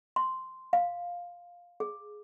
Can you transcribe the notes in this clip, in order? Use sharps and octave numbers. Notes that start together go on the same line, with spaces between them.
C6
F5
G#4